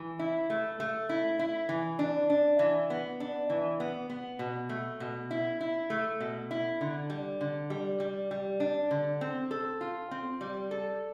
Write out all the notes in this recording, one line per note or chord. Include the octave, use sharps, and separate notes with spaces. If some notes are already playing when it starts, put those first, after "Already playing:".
Already playing: E3
E4
A3
A3
E4
E4
E3
D4
D4
E3
B3
D4
E3
B3
B3
B2
A3
B2
E4
E4
A3
B2
E4
D3
G3
D3
G3
G3
G3
D4
D3
C4
A4
F4
C4
G3
A4